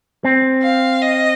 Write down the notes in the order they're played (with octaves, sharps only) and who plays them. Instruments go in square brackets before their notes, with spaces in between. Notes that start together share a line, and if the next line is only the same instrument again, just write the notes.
[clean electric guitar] C4
[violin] F5
D#5